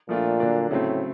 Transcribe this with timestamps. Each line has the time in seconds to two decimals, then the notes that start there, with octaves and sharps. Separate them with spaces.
0.09 A#2 F3 A3 D4 F4
0.40 D3 F#3 A#3 D4
0.70 A2 C#3 F#3 A3 C4